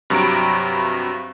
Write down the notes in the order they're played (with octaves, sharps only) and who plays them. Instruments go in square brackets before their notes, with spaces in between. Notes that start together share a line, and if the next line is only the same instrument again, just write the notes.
[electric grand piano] G2 C3 F#3 A#5 B5 D7